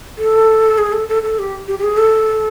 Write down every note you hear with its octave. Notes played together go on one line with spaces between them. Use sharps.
A4
G#4
A4
A4
A4
G4
G4
G4
G#4
A4